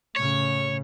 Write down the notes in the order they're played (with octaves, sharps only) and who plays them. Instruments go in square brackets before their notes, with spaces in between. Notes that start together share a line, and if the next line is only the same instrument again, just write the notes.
[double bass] A2 C#3 [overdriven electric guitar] C#5